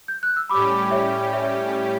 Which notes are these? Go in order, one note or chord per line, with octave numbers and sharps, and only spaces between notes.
G6
F#6
E6
A2 G3 C#4 G4 B5 D6
C#5 E5
C#5 E5